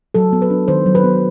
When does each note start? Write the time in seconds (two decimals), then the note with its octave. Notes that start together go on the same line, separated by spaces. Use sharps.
0.14 F#3 A4
0.33 B3
0.42 B4
0.50 D4
0.68 D#3 C5
0.86 F#3
0.95 B4
1.04 B3